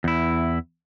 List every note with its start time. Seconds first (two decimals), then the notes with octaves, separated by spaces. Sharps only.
0.04 E2 E4